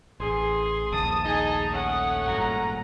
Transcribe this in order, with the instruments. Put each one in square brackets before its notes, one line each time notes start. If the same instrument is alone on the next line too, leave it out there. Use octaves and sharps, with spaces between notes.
[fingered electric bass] A1 [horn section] G#4 [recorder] C6
[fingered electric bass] F1 A#1 D#2 [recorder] A5 [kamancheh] D#6
[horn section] D#4 D#5 [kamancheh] G#4 G#5
[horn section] A3 C#4 [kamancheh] F#5 [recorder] D#6
[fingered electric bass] G#1 G2 A#2 [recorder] A#5